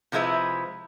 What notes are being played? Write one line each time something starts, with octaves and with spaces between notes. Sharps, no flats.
C3 F3 G#3 E4 B4